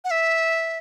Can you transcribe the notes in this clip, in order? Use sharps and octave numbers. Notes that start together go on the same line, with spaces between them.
F#5
E5